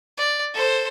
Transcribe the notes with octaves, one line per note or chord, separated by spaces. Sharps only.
D5
A4 C5